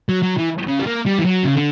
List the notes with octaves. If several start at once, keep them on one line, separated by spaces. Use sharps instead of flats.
F#3
F#3
E3
C#3
G3
A#3
G3
E3
F#3
C#3
D3